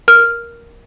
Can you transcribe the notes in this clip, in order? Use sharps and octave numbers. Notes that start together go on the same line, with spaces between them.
A#4 F6